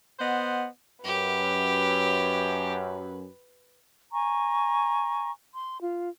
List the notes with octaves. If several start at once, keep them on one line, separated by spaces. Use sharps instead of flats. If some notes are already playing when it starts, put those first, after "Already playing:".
B3 C5 D#5 F#5
F#2 G4 B4
G#5 A#5 C#6
C6
F4